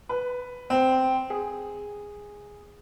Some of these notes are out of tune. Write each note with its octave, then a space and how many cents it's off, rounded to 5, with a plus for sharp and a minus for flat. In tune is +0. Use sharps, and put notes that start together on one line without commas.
B4 +5
C4 -10
G#4 -10